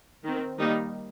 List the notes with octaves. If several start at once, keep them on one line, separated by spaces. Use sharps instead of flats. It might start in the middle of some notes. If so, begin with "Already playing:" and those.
D#3 C4
D#3 G3 A#3 D#4